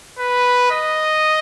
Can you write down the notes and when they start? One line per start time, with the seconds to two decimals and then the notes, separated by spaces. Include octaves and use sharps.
0.19 B4
0.71 D#5